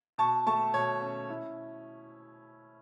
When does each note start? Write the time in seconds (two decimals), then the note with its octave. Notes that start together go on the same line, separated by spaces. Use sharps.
0.18 B2 A5 C#6
0.47 A3 A5 C#6
0.74 B2 C#5
1.01 C#4
1.29 E4